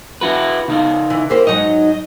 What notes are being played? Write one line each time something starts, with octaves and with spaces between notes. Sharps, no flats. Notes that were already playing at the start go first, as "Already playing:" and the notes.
E4 F#4 B4
C#3 D#4 F5
E3
A#3 G4 C5
G#2 F#3 D#4 D#5